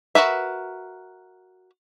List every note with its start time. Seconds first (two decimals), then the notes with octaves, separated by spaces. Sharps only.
0.15 F#4 A#4 B4 E5